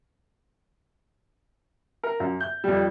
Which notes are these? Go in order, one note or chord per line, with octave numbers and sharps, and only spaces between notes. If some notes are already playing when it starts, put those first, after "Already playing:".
A#4
F#2
G6
F2 G3